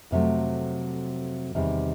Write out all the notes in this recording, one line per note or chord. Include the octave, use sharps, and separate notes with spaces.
F2 C3 D#3 F#3 A3
E2 C3 D#3 G3